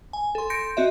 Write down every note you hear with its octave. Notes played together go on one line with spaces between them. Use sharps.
G#5
A4 C6
C6 G6 A#6 C#7 D7
C4 F#4 D#5 E5